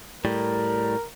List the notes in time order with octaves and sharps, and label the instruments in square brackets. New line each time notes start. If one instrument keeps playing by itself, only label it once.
[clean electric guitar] A2 G3 [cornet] A#4